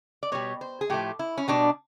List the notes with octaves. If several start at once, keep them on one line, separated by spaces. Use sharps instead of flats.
D5
B2 G3 C#5
C5
G#4
A2 F3 A3 G4
E4
C#4
B2 G3 D4